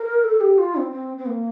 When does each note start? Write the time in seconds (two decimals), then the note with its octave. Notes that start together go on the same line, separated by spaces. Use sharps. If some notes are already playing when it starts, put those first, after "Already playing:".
Already playing: A#4
0.24 A4
0.40 G4
0.58 F4
0.76 C4
0.92 C4
1.17 C4
1.26 A#3